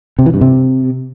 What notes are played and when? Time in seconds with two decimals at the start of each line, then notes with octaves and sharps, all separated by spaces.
0.19 C3
0.26 E3
0.34 G2
0.41 C3